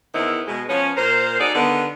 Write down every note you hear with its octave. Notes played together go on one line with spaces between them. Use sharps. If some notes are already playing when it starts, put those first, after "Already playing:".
E2 D#3 B3 C4 E4
B2 G#3
F3 B3 C#4
A#2 A#4 C5
D#4 F#4 G#4 A4 D5
D3 D#3 G3 B3